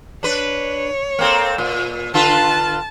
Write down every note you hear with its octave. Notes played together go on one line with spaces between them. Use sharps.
D4 B4 C#5
A#3 C4 A4
A#2
D3 F4 B4 A5